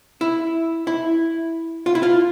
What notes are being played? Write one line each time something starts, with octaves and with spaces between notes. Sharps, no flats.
E4
E4
F4
E4
F4